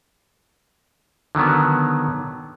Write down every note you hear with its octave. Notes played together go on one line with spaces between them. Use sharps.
D3 D#3 F#3 B3